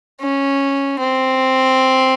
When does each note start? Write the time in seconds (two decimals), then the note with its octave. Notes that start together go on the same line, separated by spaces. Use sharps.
0.21 C#4
1.00 C4